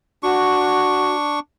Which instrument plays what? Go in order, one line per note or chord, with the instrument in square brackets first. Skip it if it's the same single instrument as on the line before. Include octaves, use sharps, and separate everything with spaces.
[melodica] D4 C#6 [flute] F#4